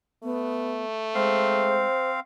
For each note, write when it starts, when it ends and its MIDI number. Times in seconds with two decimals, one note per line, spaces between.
0.23 1.84 57
0.23 0.85 59
1.15 1.86 56
1.15 2.20 60
1.15 2.10 72
1.15 2.20 77